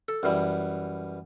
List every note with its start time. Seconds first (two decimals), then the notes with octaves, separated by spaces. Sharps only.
0.08 A4
0.23 F#2 E3 G3